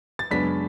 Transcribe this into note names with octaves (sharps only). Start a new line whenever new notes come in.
A6
F#2 C#3 G#3 B3 D4 B6